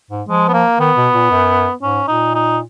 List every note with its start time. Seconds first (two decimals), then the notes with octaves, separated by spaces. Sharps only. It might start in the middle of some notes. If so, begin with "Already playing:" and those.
0.11 G#2
0.28 F3 G#3
0.49 B3
0.53 A#3
0.79 D#3 B3
0.97 B2
1.15 A#2
1.31 F#2
1.82 G#2 C#4
2.08 A#2 D#4
2.35 D#4